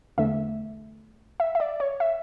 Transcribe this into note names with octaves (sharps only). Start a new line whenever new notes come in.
E2 D3 A3 E5
E5
E5
D5
C#5
E5